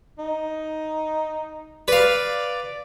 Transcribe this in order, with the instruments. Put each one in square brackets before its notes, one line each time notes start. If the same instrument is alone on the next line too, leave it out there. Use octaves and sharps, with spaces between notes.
[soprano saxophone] D#4
[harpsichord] B4 F5 [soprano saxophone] D5